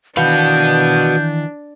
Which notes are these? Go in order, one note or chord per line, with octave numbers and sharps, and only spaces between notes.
D#3 E3 D4 F#4 B4 F5 G6